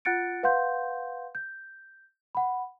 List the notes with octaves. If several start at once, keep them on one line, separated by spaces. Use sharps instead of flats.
F4 F#5 F#6 A6 C#7 D7
B4 F5 F#5 C6 G6
G6
F#5 B5